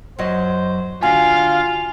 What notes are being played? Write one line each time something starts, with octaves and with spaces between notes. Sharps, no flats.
F#2 F#3 C5 D#5
D3 F4 F#4 F5 G#5